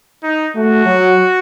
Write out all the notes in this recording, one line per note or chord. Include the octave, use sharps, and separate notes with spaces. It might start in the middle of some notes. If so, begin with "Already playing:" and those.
D#4
A3 F#4
F#3